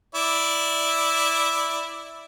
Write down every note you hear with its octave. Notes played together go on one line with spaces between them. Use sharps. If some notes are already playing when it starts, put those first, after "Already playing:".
E4 D5